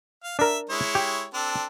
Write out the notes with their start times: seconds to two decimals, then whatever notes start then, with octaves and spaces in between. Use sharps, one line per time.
0.24 F5
0.39 D4 A#4 E5
0.69 G#3 E4 C#5
0.95 G4
1.34 C4 D4 A4